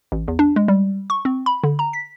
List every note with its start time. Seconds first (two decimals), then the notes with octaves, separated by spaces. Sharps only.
0.12 A1
0.28 E2
0.39 D4
0.56 G#3
0.68 G3
1.10 C#6
1.25 C4
1.46 B5
1.64 D3
1.79 A#5
1.93 B6